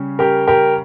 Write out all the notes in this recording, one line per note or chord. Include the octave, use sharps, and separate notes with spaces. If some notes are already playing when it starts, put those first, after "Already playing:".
Already playing: C#3 G3 C#4
G4 A#4
G4 A#4